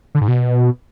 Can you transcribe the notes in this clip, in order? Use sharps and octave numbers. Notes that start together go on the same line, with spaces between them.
D3
G#2
B2